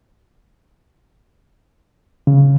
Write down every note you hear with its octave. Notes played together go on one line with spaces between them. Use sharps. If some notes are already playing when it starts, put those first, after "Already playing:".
C#3